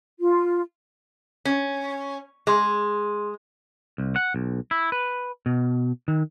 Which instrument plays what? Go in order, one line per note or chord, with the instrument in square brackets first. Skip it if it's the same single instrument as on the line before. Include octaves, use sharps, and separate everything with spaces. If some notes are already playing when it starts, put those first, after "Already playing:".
[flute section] F4
[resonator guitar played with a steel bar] C#4
[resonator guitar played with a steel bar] G#3 [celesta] G#4 C6
[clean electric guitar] C2
F#5
B1
E4
B4
B2
D#3